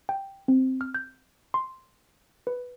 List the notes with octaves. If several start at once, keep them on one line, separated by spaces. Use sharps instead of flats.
G5
C4
F6
G6
C6
B4